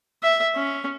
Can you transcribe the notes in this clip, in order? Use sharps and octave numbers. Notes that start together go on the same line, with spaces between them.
E5
C#4